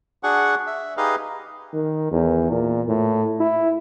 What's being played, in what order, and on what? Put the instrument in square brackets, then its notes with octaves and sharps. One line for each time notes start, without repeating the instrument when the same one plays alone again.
[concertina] D4 F#4 G#4 F#5 C#6
E5
D#4 G4 G#4 B4 D#5 F5
[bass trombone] D#3
E2
A#2
A2
E4